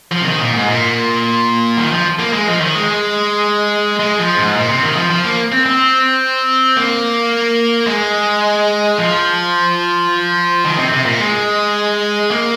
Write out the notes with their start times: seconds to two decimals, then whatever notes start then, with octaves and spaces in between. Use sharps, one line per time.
0.11 F3
0.21 C3
0.25 D#3
0.39 A#2
0.53 G#2
0.67 A#2
1.77 D#3
1.91 F3
2.19 A#3
2.33 G#3
2.47 F3
2.61 D#3
2.75 G#3
4.00 G#3
4.18 F3
4.36 G#2
4.55 A#2
4.69 C3
4.83 D#3
4.96 F3
5.10 F3
5.24 A#3
5.52 C4
5.66 C4
6.77 A#3
7.87 G#3
8.98 F3
10.65 D#3
10.78 C3
10.92 C3
11.06 A#2
11.20 G#3
12.31 A#3